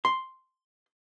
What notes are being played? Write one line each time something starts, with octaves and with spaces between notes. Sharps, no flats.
C6